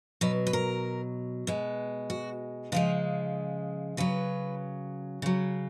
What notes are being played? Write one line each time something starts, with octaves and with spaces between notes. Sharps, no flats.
B2 F#3 B4
B4
A#4
B2 G#3
F#4
C#3 F3 G#3 F4
C#3 F#3 B4
C#3 F#3